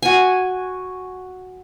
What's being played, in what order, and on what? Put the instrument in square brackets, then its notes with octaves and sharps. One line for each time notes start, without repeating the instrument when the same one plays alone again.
[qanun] F#4 G#5